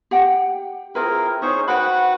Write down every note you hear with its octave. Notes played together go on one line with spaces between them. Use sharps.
G4 F#5 G5
C4 E4 F4 G#4 A#4 B4
D#4 G#4 C5 C#5 C#6
F#4 B4 C5 F#5 G5 B5